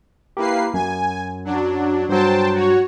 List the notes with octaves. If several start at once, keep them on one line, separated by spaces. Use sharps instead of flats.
A#3 E4 G4 B4 C7
F#2 G#5
F#3 D4
G2 F#3 C5 G5 A5
F#4 C#5